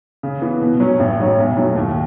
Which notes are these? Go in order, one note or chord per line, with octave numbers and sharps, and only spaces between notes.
C#3
E3 B3
B2
F#3 C#4
A1
G#2 F#3 C#4
B1
A2 F#3
D#2